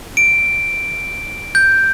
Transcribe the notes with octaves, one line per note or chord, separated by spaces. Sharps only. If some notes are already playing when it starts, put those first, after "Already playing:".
D7
G6